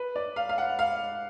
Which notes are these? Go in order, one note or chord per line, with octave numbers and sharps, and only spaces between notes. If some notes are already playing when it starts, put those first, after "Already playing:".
Already playing: B4
D5
F5
F5
F#5
F5